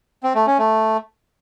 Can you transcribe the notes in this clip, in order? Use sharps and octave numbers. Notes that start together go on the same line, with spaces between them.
C4
A3
C#4
A3